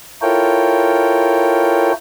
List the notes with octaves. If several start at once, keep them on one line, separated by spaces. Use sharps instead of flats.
E4 F4 A4 A#4 C#5 G5